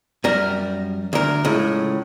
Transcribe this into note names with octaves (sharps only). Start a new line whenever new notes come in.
F#2 G3 A#4
D2 A#4
C#2 A2